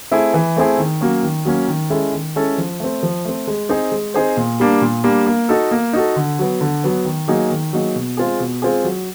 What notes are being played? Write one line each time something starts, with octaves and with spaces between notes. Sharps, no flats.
A3 C4 E4 G#4
E3
A3 C4 E4 G#4
D#3
F#3 A#3 C#4
D#3
F#3 A#3 C#4
D#3
G#3 C#4 E4 A4
D#3
G#3 C#4 E4 A4
F3
A3 C4
F3
A3 C4
G#3
C4 D#4 G#4 C5
G#3
C4 D#4 G#4 C5
A#2
G3 A#3 D4
A#2
G3 A#3 D4
A#3
D#4 F#4 A4
A#3
D#4 F#4 A4
D3
F#3 B3
D3
F#3 B3
D#3
F#3 A#3 D#4 G#4
D#3
F#3 A#3 D#4 G#4
B2
G#3 C4 F4 G#4
B2
G#3 C4 F4 G#4
F#3